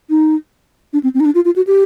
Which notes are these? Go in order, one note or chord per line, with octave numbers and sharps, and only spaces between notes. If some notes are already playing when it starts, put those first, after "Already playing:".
D#4
D4
C4
C4
D#4
D4
F4
F4
F#4
G4